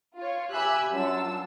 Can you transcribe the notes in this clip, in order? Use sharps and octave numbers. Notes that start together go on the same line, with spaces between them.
F4 C#5
G4 E5 G#5 B5 E6 F#6
F#2 F#3 D4 F4 A5 E6